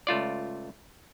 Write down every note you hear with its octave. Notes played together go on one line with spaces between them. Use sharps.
C#2 A3 F4 D5